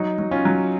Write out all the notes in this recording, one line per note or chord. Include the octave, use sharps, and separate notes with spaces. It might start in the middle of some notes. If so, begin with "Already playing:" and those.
Already playing: F#3 D#4
F#3
C#4 F4
F#3